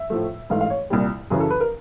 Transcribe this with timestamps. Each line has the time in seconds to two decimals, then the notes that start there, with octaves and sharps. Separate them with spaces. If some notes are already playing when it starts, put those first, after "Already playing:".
Already playing: E5
0.10 A2 F3 A3
0.50 G#2 E3 A3 F5
0.61 F5
0.70 C#5
0.90 C2 A#2 G3
1.30 F#2 C#3 E3 G#4
1.40 A4
1.50 B4
1.60 A#4